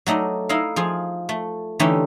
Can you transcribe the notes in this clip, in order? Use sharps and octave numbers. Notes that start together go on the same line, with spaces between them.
F#3 A3 D#4 D5
D#4 E4 D#5 F5
F3 F4 G#4
A3
D3 E3 A3 C#4 D#4 G4